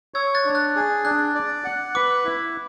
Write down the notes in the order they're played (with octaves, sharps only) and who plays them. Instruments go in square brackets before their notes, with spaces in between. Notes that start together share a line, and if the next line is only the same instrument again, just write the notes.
[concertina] C#5 [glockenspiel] E6 G#6
[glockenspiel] F#6 A6
[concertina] D4
[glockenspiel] F#6 A6
[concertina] G#4
[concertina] D4 [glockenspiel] F#6
[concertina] D5
F#5
[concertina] B4 [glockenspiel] D6
[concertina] E4